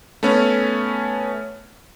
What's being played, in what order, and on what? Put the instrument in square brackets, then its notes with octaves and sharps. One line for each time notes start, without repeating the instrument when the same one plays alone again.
[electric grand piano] A3 B3 C#4